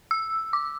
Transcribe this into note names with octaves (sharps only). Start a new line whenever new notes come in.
E6
D6